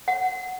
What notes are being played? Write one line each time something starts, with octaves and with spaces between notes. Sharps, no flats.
F#5